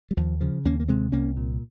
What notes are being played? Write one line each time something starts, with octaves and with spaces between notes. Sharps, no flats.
G3
D#2 F3
C#3 F3
D#2 A#3 C#4
A#3
C3 G#3 C4
C2 A#3 C#4
A#2